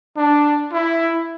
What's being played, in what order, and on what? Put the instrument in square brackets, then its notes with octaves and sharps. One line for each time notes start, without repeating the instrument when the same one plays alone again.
[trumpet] D4
E4